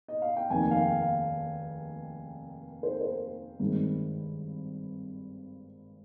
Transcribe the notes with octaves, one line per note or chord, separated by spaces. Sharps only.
D#5
F5
G5
F1 D#2 D#3 G#5
F5
G5
F5
C5
A#4
C5
G#1 G2 D#3 G#3